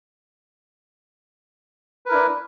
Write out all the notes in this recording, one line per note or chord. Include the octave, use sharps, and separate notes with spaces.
D4 E4 A#4 B4